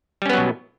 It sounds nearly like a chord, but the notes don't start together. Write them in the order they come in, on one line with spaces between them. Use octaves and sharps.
G3 C#4 B3 F#3 B2